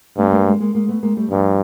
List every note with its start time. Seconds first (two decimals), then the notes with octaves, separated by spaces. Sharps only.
0.17 G2 A3 B3
0.32 G#3 A#3
0.46 G#3 A#3
0.60 G#3 A#3
0.75 G#3 A#3
0.88 A3 B3
1.03 G#3 A#3
1.17 G3 A3
1.31 G2 F3 G3